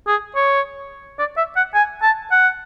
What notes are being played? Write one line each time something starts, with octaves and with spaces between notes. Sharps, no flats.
G#4
C#5
D5
E5
F#5
G#5
A5
F#5